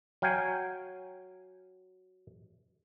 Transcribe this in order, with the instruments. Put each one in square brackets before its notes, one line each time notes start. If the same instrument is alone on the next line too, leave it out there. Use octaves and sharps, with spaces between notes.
[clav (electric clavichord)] F#3 F5 G5 G#5